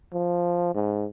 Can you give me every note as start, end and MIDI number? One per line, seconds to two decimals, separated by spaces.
0.13 0.70 53
0.75 1.06 44